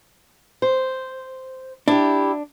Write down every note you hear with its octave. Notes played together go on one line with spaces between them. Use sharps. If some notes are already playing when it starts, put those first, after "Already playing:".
C5
D4 E4 G4